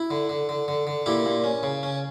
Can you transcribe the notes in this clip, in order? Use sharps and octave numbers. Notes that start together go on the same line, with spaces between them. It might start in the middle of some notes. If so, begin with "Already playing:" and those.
Already playing: E4
D3
D3
D3
D3
D3
A#2 E4 G4
A#2
C#4
C#3
C#4